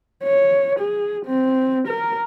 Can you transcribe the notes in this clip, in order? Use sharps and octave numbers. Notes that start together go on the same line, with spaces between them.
C#5
G#4
C4
A#4